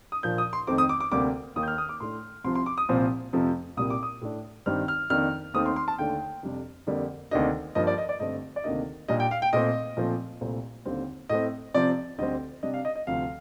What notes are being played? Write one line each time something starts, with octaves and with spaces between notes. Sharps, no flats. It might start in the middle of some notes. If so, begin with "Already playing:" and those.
D#6
A#2 F3 A#3 D4 G6
D#6
C6
F2 D#3 A3 C4 D6
D#6
D6
D6
D2 C3 G3 A#3 D6
D#2 D#3 A#3 D#6
G6
F6
D#6
D6
A2 A3 D4 C6
C2 C3 F3 C6
C6
D6
D#6
C2 A#2 F3 C4
F2 C3 F3 A3
C2 A#2 G3 A#3 D#6
D6
D#6
A2 A3 D4
G2 D#3 G3 C4 F6
F6
F2 D#3 A#3 D4 F6
D#2 D#3 A3 C4 D#6
C6
C6
A5
D#2 D3 A3 D4 G5
F2 C3 G3 D4
F2 D3 G3 A#3
D2 C3 D#3 A#3 D4 D#5
G2 F3 A#3 D#5
D5
D#5
D5
G2 D3 A3 C4 D#5
D5
D2 C3 D#3 A#3 D4 D#5
A#2 G3 D4 D#5
G5
F5
G5
A#2 A3 C4 D#5
A#2 F3 A3 C4
C2 A#2 A3 C4
D#2 D3 G3 C4
A2 A3 C4 D#5
C3 F3 C4 D5
D2 D3 G3 C4 D#5
C3 G3 D4 D#5
F5
D#5
D#5
D2 C3 F3 F5